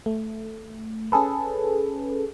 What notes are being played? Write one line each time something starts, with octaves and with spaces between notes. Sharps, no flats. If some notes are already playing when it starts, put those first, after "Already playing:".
A3
C#4 G#4 A4 B4